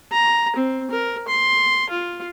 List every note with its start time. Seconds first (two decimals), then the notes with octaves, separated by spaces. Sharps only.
0.12 A#5
0.56 C4
0.91 A#4
1.28 C6
1.90 F4